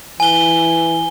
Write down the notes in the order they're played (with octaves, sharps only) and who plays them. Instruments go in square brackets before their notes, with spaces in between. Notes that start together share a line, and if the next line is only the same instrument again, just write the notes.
[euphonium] E3 [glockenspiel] G#5 G7